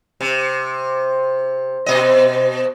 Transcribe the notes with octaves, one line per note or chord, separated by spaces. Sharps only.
C3
B2 D#5